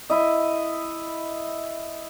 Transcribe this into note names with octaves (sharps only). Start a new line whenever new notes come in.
E4 D#5